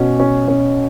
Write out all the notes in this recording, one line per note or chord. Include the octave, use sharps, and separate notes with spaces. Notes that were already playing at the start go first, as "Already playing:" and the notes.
Already playing: B2 C#4
C#4
C#4